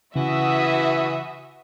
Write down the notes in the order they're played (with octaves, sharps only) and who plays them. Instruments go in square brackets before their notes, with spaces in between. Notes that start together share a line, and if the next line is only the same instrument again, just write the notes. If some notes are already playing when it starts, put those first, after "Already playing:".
[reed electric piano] C#3 [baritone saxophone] E3 [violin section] F#4 E5 D#6